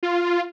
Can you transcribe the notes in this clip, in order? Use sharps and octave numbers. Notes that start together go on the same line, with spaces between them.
F4